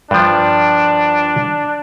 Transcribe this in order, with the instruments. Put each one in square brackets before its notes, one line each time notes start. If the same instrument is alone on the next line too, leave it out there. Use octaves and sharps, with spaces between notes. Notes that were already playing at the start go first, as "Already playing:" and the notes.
[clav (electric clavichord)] G2 F3 [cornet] D4